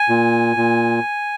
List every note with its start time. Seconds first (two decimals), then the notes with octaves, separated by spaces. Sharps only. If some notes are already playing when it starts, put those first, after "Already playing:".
Already playing: G#5
0.09 A#2
0.56 A#2